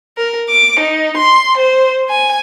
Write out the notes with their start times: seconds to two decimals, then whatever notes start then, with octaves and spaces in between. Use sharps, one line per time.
0.18 A#4
0.49 D6
0.80 D#4
1.17 C6
1.57 C5
2.10 G#5